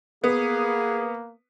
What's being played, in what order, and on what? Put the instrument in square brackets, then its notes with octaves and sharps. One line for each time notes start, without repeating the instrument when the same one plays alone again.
[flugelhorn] A#3 [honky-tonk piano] B3 [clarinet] G#4